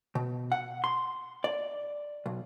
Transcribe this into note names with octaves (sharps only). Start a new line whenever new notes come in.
B2
F#5
C6
D5
B1